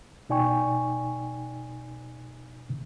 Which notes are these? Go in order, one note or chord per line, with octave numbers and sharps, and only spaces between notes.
B2 D#4 D5 G5 G#5 C#6